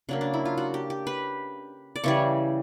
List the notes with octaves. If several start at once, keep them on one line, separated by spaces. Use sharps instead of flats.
C#3 F#3 A#3 D4
D4
E4
F4
F#4
G4
G4
B4
D5
C#3 E3 G3 C#5